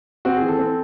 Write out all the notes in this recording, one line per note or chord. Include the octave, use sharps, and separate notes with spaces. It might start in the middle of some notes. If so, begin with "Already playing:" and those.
C4 F#4
G#4
E3
A4
C4